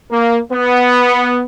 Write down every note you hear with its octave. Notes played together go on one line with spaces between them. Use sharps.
A#3
B3